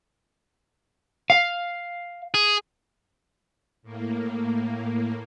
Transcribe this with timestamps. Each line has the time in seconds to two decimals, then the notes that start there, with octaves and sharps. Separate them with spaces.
1.30 F5
2.34 G#4
3.83 A2 A#3